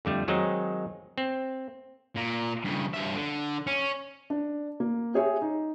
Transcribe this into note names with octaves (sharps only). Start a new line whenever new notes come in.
F2 D3 G3 A3
D#3 F#3 G#3 C4 D#4
C4
A#2
G2 C#3
G2 E5
D3
C#4
D4
A#3
G4 G#4 C#5 E5
D#4